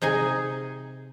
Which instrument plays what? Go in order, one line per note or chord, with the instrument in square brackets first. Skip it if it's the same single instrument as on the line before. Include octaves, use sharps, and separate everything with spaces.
[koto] C3 D#4 G#4 G#5